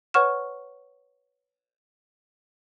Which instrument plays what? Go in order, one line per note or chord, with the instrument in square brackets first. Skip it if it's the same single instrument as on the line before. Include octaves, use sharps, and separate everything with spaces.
[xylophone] B4 C#5 F#5 C#6 F6 E7